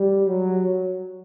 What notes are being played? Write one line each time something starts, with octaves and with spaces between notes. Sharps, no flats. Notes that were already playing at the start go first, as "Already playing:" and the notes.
Already playing: G3
F#3